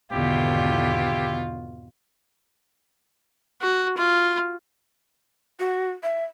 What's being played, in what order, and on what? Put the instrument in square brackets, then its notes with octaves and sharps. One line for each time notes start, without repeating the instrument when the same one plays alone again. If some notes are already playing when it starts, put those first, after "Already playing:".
[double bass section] G#1 E2 D3 [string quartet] B2 F4 [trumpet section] E4 G4
[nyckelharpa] F#4
F4
[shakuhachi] F#4
E5